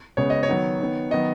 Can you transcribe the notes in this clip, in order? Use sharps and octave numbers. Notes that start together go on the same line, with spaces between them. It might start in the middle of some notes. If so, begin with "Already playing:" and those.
C#3 G#3 B3 C#5
D#5
C#5
D#3 F#3 B3
D#3 B3
D#3 F#3 B3 D#5